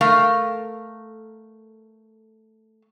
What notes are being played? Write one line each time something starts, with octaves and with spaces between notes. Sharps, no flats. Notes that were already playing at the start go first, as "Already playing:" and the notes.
A3 A#4 F5